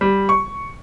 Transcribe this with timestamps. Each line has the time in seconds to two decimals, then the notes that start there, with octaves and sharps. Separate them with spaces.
0.01 G3
0.29 C#6